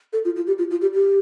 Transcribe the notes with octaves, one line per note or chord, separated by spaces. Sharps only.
A4
F4
F4
G4
F4
F4
G4
G4